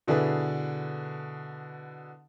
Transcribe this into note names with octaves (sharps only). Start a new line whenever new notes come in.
B2 D3 D4 E4 G#4 B4